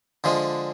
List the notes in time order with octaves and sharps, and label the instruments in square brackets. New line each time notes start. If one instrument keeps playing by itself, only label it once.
[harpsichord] D3 F3 G#3